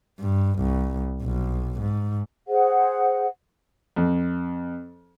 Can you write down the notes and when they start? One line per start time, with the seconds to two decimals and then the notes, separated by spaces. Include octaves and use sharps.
0.20 G2
0.59 C2
1.22 B1
1.80 G#2
2.48 G#4 C5 F#5
3.96 F2